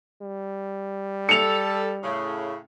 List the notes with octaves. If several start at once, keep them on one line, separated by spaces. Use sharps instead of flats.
G3
A4 C#7 F7
A2 C#3